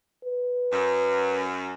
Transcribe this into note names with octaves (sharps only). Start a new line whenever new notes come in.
B4
F#2